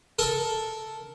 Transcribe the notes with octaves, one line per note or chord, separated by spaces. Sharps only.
A4 A#4